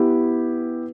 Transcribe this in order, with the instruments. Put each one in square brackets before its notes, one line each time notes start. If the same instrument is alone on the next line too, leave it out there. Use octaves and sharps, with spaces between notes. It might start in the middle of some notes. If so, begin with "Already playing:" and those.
Already playing: [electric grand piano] B3 E4 G4 B4